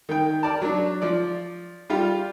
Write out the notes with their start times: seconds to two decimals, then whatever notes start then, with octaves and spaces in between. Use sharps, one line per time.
0.09 D#3 G5
0.43 A#4 D5 A5
0.62 F#3 D4
1.02 F3 D5
1.90 G3 F4 G4